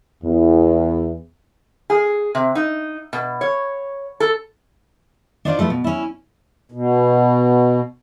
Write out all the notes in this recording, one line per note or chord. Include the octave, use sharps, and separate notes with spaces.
E2
G#4
C3
D#4
B2
C#5
A4
D4 D#4 F4 C5 D5
F3 A3 F4 B4
B2
C#4 E4
B2